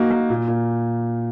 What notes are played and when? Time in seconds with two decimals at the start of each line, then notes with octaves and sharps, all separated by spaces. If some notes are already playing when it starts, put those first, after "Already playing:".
Already playing: A#3 D#4 F#4
0.11 A#3
0.30 A#2
0.48 A#2